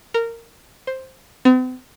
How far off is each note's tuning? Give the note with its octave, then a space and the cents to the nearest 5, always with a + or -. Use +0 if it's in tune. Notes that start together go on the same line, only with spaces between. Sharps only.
A#4 -15
C5 +5
C4 -45